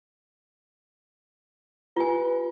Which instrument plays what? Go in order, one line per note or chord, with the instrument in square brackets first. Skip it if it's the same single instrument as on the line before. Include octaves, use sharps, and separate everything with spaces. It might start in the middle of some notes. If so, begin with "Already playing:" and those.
[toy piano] F4 G4 G#5 [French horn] B4